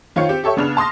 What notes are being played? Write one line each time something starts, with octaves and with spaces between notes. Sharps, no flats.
D#3 F4 C5 C#5 F5 C#7
C4 G4
G4 A4 C#5 E5 C#6
C#3 B3 D4 F6 F7
A5 C6 D#6 A#6